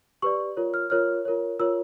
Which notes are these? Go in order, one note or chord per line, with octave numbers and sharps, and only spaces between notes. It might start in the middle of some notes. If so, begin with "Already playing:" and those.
G4 B4 D5 C#6
F4 A#4 C#5
F6
F4 A#4 C#5 F6
F4 A#4 C#5
F4 A#4 C#5 E6